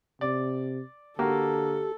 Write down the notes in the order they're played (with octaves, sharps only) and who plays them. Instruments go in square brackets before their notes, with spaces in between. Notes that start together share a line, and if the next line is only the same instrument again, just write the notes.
[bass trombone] C3 [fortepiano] D5
[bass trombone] D3 [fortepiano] A#3 F#4 [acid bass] G4 [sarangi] A4